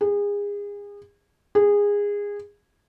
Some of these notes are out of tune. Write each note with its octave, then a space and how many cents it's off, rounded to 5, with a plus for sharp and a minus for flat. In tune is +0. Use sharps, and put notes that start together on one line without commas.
G#4 -30
G#4 -20